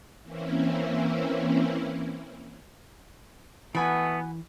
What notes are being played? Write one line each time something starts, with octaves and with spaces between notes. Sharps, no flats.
E3 A#3 C4 C#4 E4
E3 A3 B3 F#4 G#5 B5